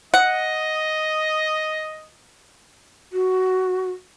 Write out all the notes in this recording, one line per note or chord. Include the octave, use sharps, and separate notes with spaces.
D#5 F#5
F#4